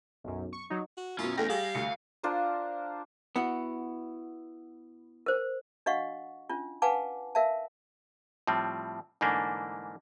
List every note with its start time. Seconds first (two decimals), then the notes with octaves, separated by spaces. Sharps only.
0.24 B1 F#2
0.53 C#6
0.70 F#3 D#4
0.97 F#4
1.18 F#2 B2 C#4 F4
1.37 E2 A3 G5 A#6
1.49 G3 G#4 F5
1.75 D2 C#7
2.23 D4 F4 A#4 C5
3.36 B3 E4 F#4
5.26 A#4 C5
5.86 D4 F#4 D#5 F5 F#5 C#6
6.49 C#4 D4 F4
6.82 B4 F5 F#5 G#5 A5 D6
7.35 A#4 E5 F5 A5
8.47 A2 F3 G3 C4
9.21 G#2 D3 E3 A3 A#3 D4